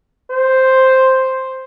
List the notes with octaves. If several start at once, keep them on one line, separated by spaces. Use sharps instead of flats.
C5